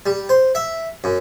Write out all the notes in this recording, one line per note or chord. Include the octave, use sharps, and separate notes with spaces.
G3
C5
E5
F#2